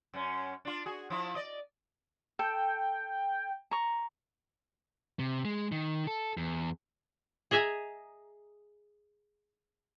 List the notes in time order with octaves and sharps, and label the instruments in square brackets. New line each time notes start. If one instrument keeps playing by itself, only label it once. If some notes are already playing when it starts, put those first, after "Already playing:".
[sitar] F#2 C#4
D4 F4
F#4 G#4
F3 E4
D5 D#5
[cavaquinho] A4 [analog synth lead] G5
[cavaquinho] A#5 C#6
[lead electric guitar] C3
G#3
D#3
A4
E2
[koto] G#4 D#5 E5 G#5 A#5